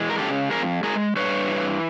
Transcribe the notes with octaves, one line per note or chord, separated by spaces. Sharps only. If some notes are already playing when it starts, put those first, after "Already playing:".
Already playing: E3 G#3
A#4
C#3 G4 A4
F2 G#4 A#4
G#3 G#4 A#4
G2 B4 C#5
E3